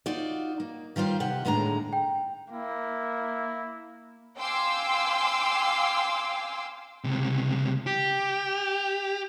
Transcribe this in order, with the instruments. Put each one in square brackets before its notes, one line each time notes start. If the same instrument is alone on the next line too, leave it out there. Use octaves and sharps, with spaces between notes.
[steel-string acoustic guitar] D#4 F4 F#4 D5
A#3
D#3 G3 F4 C5
C3 G4 F#5
D#2 A2 D3 G#3 A#5
[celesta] G5
[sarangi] A#3 [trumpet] E4
[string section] F5 G5 G#5 C6 D6 E6
[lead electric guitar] C#2 C3
G4